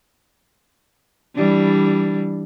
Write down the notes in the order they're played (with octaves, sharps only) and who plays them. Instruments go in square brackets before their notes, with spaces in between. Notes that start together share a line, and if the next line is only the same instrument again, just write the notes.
[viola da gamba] E3 G3 D4